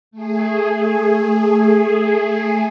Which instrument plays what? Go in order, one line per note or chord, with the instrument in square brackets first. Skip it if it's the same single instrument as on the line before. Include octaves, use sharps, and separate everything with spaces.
[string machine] A3 G#4